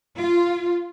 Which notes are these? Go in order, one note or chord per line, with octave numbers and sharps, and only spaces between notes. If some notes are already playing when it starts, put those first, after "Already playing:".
F4